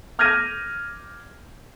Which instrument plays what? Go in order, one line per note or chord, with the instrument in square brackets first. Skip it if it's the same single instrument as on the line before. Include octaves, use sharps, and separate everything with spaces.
[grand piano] D6 F6 G6 G#6 A#6 D#7